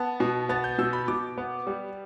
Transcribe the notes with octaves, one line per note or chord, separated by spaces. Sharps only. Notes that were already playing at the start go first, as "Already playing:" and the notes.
Already playing: B3 A5
B2
B3 A6
G6
B2 E6
B5
B2 D6
B3
G3